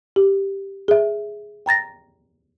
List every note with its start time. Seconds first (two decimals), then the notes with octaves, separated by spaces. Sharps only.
0.16 G4
0.88 G#4 E5
1.66 G5 A#5 A6 A#6